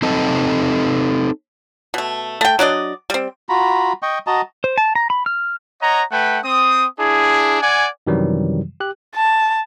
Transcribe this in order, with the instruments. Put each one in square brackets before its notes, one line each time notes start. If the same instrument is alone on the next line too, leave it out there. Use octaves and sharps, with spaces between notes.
[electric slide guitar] C4 D#4 A4 D#5 A5
[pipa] B2 A3
A3 G5
F#3 D4 D5 D#5
G3 C4
[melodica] F4 F#4 A#5 B5
D#5 G5 C#6
F#4 D#5 A5 A#5
[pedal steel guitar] C5
A5
A#5
B5
F6
[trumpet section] C#5 D#5 F#5 A#5
A3 B4 F#5 G5
C4 D#6
D4 E4 G#4
D5 F#5 G#5
[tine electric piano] F#2 C3 D#3 E3 F#3 G3
G4 F#6
[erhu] A5